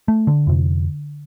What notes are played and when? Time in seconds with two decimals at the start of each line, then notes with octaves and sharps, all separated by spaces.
0.08 A3
0.27 D3
0.47 F2 C3